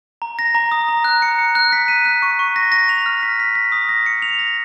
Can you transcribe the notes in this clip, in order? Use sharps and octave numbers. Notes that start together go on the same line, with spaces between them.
A#5
A#6
A#5
D#6
A#5
F#6
C#7
C#7
F#6
B6
D#7
F#6
C#6
C#6
A#6
A#6
F7
F6
B6
B6
B6
D#6
A#6
C#7
F7
A#6